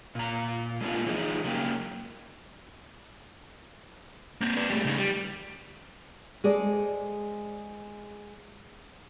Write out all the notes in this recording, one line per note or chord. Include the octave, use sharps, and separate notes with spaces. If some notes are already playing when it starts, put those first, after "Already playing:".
A#2 A#5
G#3 A#3 B3 D4 F4
E3 F3 G#3 D#4
C#3 F#3 A#3 G4
A#3 C4
B4 D5
G3 A3
C#3 D#4
G3
G#3 G#4 A4 C5 D5